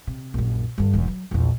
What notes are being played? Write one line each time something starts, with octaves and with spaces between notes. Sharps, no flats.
C3
A#1 F#2
G2 D3
E1 E2
F#3
A#1 E2